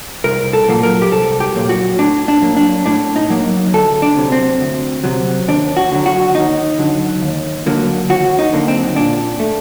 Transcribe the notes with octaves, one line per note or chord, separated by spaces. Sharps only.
C2 A#4
A4
A#2 F#3 A#3
A#4
G4
C2 A4
G4
A#2 F#3 A#3
F#4
A2 D4
D4
F#3 A#3
D4
A2 D4
D#4
F#3 A#3
D2 A4
D4
C3 F#3
C4
D2
C3 F#3
D#2 D4
F#4
D3 F#3
F#4
D#2 D#4
D3 F#3
D#2
D3 F#3 A#3
D#2 F#4
D#4
D3 F#3 A#3
C4
A#2 D4
A3